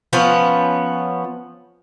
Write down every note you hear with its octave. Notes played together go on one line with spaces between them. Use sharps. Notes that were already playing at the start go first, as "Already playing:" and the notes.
F3 B3 C#4